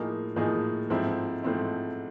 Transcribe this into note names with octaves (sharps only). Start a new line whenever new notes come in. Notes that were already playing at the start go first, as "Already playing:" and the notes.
Already playing: A2 F3 A#3 D#4 G#4
A2 F3 A#3 D#4 G#4
G#2 F3 A3 C4 E4
G#2 F3 A3 C4 E4